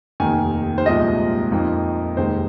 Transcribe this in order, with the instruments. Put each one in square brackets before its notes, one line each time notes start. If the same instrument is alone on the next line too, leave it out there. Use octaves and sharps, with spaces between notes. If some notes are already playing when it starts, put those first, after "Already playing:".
[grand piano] F1 D#2 D#3 G#5
C5
C2 A#2 F3 G#3 D#4 D#5
F2 F3 A#3 D#4
F1 D#2 D#3 G#3 C5